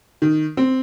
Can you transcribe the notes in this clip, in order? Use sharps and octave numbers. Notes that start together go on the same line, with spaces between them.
D#3
C4